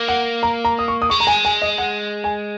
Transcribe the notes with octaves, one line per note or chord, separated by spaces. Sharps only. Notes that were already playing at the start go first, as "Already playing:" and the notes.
Already playing: A#3
F#5
A#5
A#5
D#6
C#6
D#6
G#3 C#6
A#5
G#5
G#5
D#5
F#5
G#5